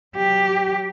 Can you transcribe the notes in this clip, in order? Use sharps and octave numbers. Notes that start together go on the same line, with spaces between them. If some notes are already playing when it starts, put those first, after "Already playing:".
F#3 G4